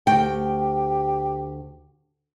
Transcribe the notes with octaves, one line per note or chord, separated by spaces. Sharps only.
D2 G4 G5